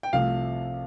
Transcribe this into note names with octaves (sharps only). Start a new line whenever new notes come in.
G5
C2 C3 F3 A3 F5